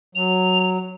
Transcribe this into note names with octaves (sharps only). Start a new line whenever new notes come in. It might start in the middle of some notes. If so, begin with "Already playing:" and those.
F#3 F7